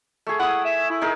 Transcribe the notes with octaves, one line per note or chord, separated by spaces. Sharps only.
A3 G#4
E4 F#5 D#6
E5
E4
D#4 G#4 A#4